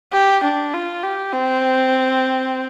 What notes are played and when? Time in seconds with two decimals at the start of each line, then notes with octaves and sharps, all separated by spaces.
0.13 G4
0.44 D4
0.74 F4
1.03 G4
1.32 C4